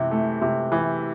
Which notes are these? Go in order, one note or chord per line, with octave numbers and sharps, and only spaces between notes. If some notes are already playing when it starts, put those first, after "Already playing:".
Already playing: C3 E3
A3
C3
E3